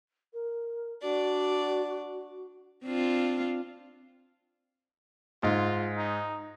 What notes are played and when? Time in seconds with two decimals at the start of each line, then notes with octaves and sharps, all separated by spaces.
0.33 A#4
1.02 D4 F#4 D5
2.85 C4 D4 F4
5.43 G#2 F4
5.97 D#4